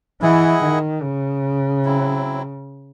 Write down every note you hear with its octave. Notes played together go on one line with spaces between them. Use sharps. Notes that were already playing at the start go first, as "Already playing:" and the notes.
E3 E4 G#4 D#5 F#5
D#3
C#3
F#3 C4 E4